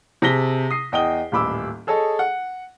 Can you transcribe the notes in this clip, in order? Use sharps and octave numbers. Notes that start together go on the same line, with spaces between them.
C3 G#4 A5 A#6 B6 G7
D#6 C7
E2 D#5 G5 D#6 G7
D#1 A1 B5 D6 E6
G#4 A4 C#5 D#5 A5
F#5